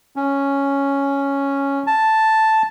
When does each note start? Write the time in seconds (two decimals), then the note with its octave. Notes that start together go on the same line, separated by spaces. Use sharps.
0.16 C#4
1.87 A5